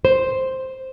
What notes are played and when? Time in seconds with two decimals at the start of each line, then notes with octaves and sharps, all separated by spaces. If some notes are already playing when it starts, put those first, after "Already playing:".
0.05 C5